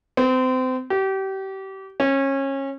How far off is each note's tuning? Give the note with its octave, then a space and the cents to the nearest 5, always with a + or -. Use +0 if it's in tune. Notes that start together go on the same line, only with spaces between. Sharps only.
C4 -30
G4 -30
C#4 -25